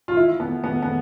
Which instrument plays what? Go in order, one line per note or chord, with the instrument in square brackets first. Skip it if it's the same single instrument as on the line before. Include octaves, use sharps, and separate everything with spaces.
[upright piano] F4
E4
B3
B3
B3